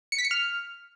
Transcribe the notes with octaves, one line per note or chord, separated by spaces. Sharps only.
C#7
B6
C#7
F6